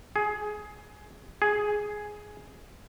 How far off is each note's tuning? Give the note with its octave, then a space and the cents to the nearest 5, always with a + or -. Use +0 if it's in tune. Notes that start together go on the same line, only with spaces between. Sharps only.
G#4 +15
G#4 +5